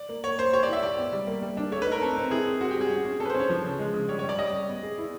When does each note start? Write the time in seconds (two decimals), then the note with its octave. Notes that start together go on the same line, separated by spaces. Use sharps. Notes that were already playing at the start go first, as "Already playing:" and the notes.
Already playing: D5
0.09 A#3
0.24 A#3 C#5
0.39 A#3 C5
0.53 G4 C#5
0.63 D5
0.68 E4 E5
0.83 G4 D5
0.98 B3
1.13 G3
1.27 A#3
1.42 G3
1.57 D4
1.72 A3 C#5
1.82 B4
1.87 D#4 A#4
2.02 C4 A4
2.17 C4
2.31 E4 G#4
2.46 C4
2.61 C4 F#4
2.71 G4
2.76 G3
2.81 G#4
2.91 C#4
3.05 C#4
3.20 C#4 A4
3.25 B4
3.30 C5
3.35 C#4
3.40 C#5
3.50 F3
3.64 C#3
3.79 G#3
3.94 C#3
4.09 G3 C#5
4.19 C#5
4.24 G3 D5
4.38 G3 D#5
4.53 G3
4.69 B3
4.83 G#4
4.98 E4